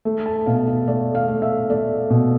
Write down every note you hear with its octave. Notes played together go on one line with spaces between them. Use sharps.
A3
A5
B2 F5
F5
A3 D5
F5
A3
E5
A3 D5
B2